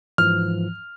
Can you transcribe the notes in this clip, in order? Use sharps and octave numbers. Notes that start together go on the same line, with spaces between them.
G#2 E3 F3 F6